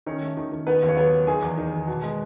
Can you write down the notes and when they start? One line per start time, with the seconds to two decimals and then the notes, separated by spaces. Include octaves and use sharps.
0.06 D#3 C#4 C#5
0.22 A3
0.37 D#3
0.52 D#3
0.67 D#3 B3 B4
0.83 D#2
0.89 C#5
0.97 F#3 B3 B4
1.13 F#3
1.27 D#3 G#4 G#5
1.42 E2
1.58 D#3
1.73 D#3
1.87 B2
2.02 G#3